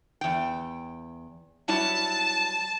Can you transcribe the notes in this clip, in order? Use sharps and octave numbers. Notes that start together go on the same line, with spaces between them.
E2 G5
F#3 G3 E4 A5